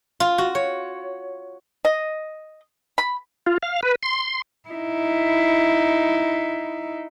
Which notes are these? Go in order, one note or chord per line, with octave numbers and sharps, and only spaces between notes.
F4
F#4
C#5
D#5
B5
F4
F5
B4
C6
D#4 E4